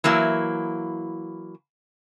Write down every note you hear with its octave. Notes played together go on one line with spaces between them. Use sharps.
E3 F#3 A#3 E4